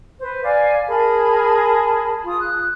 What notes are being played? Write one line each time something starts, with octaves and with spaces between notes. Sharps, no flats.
B4 C5
D5 F5 G#5
G#4 A#4 A5 B5
F4 D#6
F#6